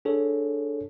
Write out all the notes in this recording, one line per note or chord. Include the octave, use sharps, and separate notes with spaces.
D4 G#4 A4 C#5